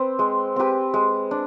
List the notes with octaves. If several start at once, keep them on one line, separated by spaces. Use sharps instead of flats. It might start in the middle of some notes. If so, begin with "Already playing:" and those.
Already playing: C4 B4
G#3
C4 G4 B4
G#3
D4